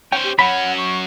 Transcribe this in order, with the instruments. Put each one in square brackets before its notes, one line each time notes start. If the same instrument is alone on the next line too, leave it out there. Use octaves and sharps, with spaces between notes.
[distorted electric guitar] C#4 C5 [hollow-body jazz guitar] G5
[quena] G4
[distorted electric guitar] F#3 C#4 [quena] F#5 [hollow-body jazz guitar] B5
[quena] C#6